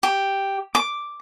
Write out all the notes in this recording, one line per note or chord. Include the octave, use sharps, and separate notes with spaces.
G4
D6